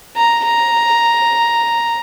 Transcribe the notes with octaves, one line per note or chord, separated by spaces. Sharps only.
A#5
A#5